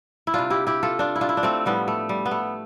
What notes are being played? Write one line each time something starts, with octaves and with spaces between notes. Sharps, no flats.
E4
C3 G3 D4 F4
E4 G4
E4 G4
F4 A4
D4 F4
E4
D4 F4
E4
D4
A3 C4
A2 F3 G3 B3
A3
G3
B3
A3